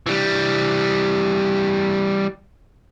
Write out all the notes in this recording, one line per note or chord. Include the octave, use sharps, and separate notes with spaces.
E3 G3